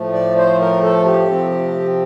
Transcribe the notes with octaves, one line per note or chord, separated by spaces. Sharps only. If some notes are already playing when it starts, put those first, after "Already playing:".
Already playing: A2 F3 A3
D5
C5
A#4
A4
G4
C3 F3 C4